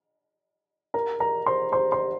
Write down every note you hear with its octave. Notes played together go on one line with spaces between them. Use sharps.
A#4 A#5
A#4 A#5
C5 C6
C5 C6
C5 C6